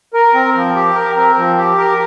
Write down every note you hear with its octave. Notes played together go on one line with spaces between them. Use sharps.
A#4
C4
F3
G4
A#4
C4
F3
G4
A#4